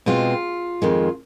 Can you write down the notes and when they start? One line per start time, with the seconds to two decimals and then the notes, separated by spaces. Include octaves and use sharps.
0.06 B2 G#3 C4 F4
0.82 F2 D#3 G#3